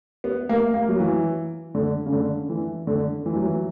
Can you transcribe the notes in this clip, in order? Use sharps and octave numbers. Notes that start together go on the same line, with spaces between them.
B3
A#3
A#3
F#3
E3
D3
C#3
D3
E3
D3
E3
F#3
E3